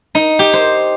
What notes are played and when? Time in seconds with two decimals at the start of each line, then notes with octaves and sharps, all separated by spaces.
0.15 D#4
0.39 G4
0.53 C5